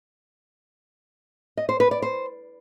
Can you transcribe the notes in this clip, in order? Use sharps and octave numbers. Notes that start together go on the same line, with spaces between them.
D#5
C5
B4
D5
C5